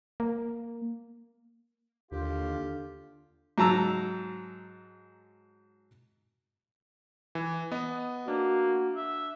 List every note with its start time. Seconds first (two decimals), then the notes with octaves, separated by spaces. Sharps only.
0.20 A#3
2.12 D#2 D3 F4 G4
3.58 G#2 F#3 A5 A#5 E6
7.35 E3
7.72 B3 D#5
8.28 A#3 D4 F#4
8.96 E5